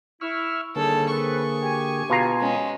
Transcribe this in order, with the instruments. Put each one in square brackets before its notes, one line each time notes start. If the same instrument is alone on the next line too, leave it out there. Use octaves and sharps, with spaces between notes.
[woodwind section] E4 [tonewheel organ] C#6 E6 F6
[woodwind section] D#2 G3 C#5 [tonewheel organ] D3 A#3 G#4 [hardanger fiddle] A4
[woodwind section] C4 A4 B4 [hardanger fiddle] C#6
[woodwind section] G4 G#5
[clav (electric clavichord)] B2 F4 A#5
[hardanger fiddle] G#3 C#4